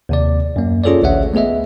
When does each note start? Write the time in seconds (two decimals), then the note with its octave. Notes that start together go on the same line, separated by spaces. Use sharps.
0.09 D#2 C3 D5
0.56 F#2 A#3
0.84 C#4 F4 G#4 A4 C#5 D5
1.02 A1 D2 C#5 E5 F#5
1.34 A3 B3 G#4 D#5 E5